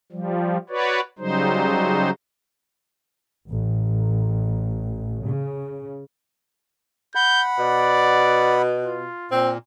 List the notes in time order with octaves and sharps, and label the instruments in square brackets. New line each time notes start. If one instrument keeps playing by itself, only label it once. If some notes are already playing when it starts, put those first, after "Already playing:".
[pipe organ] F3 G3
F#4 B4 C#5 D5
C#3 F#3 G3 D#4 C5
[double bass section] A1
C#3
[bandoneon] F#5 B5 [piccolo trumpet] G6
[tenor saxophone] B2 [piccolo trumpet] D5
[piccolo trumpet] F4
[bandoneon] A#2 [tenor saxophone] C4